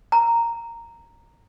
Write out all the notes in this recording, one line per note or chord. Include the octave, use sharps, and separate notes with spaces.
A#5